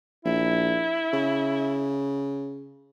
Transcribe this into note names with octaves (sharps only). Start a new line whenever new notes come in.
A#1 E4
C#3